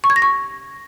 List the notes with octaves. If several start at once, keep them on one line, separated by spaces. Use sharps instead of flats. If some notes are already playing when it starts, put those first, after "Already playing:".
C#6
G#6
A#6
C#6